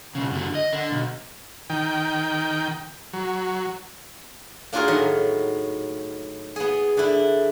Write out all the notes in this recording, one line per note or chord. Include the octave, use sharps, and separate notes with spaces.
B1 C#3
F#2 D3
D#5
D3
B1
D#3 G5
F#3
A#3 D4 F4 F#4 G#4 A#4
A2 D#3 F#3
B3 G#4
D3 D4 E4